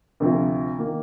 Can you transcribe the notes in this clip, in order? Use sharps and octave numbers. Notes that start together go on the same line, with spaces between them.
D2 C3 F3
D#3 A#3